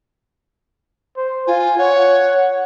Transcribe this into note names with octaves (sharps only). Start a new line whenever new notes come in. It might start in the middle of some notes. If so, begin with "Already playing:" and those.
C5
F4 G#5
C#5 F#5